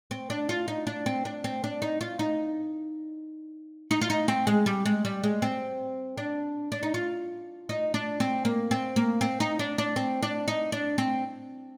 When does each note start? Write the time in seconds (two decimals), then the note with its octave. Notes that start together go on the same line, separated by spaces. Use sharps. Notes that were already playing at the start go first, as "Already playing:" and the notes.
0.11 C4
0.30 D4
0.49 F4
0.68 D#4
0.87 D4
1.06 C4
1.25 D4
1.44 C4
1.64 D4
1.82 D#4
2.01 F4
2.19 D#4
3.91 D#4
4.01 F4
4.10 D#4
4.28 C4
4.47 G#3
4.66 G3
4.85 G#3
5.05 G3
5.24 G#3
5.42 C4
6.18 D4
6.72 D4
6.83 D#4
6.94 F4
7.69 D#4
7.94 D4
8.20 C4
8.45 A#3
8.71 C4
8.96 A#3
9.21 C4
9.40 D#4
9.59 D4
9.78 D4
9.96 C4
10.23 D4
10.48 D#4
10.72 D4
10.98 C4